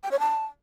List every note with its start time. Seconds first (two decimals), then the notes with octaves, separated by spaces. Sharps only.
0.03 G5
0.11 C#5
0.19 A5